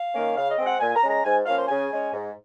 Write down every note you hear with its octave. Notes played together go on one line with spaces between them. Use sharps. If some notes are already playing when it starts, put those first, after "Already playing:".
Already playing: F5
D#3 A#3 C#4
C#3 F5
D#5
G#3 C4
F#5
A#2 G#5
A#5
G#3 C#4
A#5
G#2 G#5
F3 A#3 C#4 F5
C5
C#3 G#5
G#3 C#4
G#2